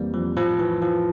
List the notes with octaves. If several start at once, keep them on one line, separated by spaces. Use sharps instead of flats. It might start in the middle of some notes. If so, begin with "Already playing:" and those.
Already playing: F2 E3 G3 A#3 C4
F3
A2 F3
E3
E3 F3